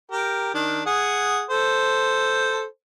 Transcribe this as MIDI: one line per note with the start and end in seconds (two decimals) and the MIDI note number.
0.12 0.53 67
0.12 0.53 70
0.54 0.81 51
0.54 0.81 62
0.86 1.43 68
0.86 1.43 78
1.50 2.64 69
1.50 2.64 72